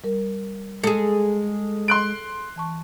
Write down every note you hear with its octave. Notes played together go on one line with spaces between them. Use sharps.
G3 A#4
G#3 G#4 A4
C6 F#6 D7
E3 A5 C#6